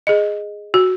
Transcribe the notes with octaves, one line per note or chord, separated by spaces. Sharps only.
G#4 D#5
F#4